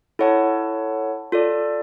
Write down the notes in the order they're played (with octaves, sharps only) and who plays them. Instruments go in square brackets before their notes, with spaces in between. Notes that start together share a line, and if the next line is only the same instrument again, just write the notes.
[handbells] E4 A4 C#5 F#5 A5
F4 A4 D5